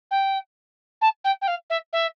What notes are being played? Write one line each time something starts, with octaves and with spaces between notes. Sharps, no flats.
G5
A5
G5
G5
F5
E5
E5